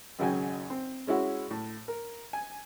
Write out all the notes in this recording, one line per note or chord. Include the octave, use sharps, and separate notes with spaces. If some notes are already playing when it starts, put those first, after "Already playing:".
G#1 F#2 C#3 F#4 G5 G#5
C4
G#3 C#4 E4 F#4
A2
A#4
G#5